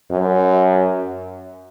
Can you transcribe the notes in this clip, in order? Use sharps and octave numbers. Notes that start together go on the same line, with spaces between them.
F#2